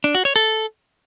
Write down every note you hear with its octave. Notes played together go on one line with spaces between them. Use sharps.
D4
F#4
C#5
A4